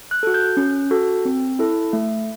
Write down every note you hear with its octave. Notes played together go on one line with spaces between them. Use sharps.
F#6
F#4 A4
G6
C#4
F#4 A4
C4
E4 A4
A3